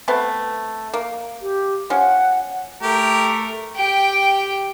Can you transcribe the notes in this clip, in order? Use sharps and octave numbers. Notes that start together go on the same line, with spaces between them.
A3 B3 C4
A#3
G4
F3 C#4 F#5
A3 G4 A#4
G4 G5